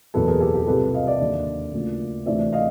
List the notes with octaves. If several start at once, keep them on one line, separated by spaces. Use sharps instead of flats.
F#1 E2 B2 F#3 A4 B4
G#4 A#4
G4 A4
G4
C2 C3 F3 A4 B4
D#5 F5
D5 E5
D#2 D3 F#3
D2 C#3 F3 A#3
D2 C3 E3 A3 C4 D5 E5
D#5 F5